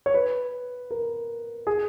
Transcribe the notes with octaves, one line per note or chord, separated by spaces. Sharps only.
C#5
B4
A#4
G#4